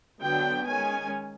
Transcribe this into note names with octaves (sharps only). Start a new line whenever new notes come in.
D3 F#3 B3 D4 G5
D#3 G#3 C#4 G#5